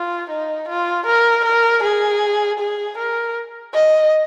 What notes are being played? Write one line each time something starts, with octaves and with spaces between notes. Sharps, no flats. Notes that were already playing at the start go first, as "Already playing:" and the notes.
Already playing: F4
D#4
F4
A#4
A#4
G#4
G#4
A#4
D#5